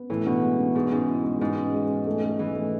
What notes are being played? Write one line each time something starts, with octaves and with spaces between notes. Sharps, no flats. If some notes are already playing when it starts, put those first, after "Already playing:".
Already playing: B3
A2 E3
B2 D4
G#3
D4
G#2 G#3
G#2 C#4
E4
G#3
G#2 G#3
C#4
G#3
C#4
A3
A3
E3 A3
A3